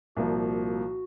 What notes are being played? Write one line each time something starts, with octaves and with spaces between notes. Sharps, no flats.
C2 A#2 F3 A#3 F#4